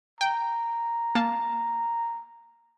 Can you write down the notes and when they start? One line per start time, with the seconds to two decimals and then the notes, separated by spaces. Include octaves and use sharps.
0.21 G5 A#5
1.15 A#3 A5